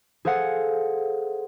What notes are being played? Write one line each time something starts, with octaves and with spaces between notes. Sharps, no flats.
G#4 A4 C5 F5 F#5